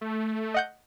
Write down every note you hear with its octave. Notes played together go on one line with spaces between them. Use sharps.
A3
D#5 F#5 G6